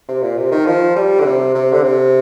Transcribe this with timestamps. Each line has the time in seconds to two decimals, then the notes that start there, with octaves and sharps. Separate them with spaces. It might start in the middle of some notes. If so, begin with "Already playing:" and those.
0.08 C3
0.22 A#2
0.37 C3
0.51 D#3
0.66 F3
0.96 G3
1.20 D3
1.25 C3
1.55 C3
1.72 D3
1.83 C3